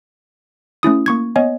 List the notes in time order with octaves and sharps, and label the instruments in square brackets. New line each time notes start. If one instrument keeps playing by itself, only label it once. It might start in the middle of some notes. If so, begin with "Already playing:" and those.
[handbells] A3 C#4 E4 D#6
A#3 C#6 G#6
B3 C#5 D#5 G#5